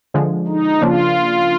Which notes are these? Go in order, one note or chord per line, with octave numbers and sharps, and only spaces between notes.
D3 F3 G#3
D#4
C#3 F3 A#3 D4 F4